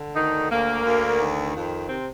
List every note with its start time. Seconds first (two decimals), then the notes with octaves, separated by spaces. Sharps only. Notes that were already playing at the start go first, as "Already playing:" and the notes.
Already playing: D3
0.16 D2 D#3 D#4
0.51 D2 A#3
0.85 D2
1.21 D#3
1.55 F2
1.89 C3 C4